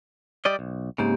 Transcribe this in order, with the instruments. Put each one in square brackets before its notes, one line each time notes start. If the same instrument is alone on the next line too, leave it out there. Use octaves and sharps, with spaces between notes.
[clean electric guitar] G3 D5 D#5
B1
[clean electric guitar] G#2 C#3 [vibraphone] A#3 C4 G4